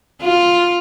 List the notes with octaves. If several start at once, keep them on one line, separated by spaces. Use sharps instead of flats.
F4